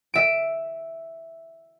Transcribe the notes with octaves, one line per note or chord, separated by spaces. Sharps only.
E5 D7